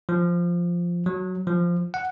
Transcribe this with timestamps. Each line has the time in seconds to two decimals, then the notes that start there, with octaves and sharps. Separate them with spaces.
0.09 F3
1.06 F#3
1.47 F3
1.94 F#5